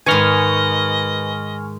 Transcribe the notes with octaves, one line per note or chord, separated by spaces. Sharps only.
G#2 D#3 B4 D#5 G#5 C#6 F6